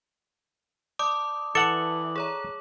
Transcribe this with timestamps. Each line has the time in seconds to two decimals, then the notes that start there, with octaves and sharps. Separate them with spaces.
0.99 D5 A5 D6 D#6
1.55 E3 A4 F#5 D6 F#7
2.16 G#4 C#5 A#5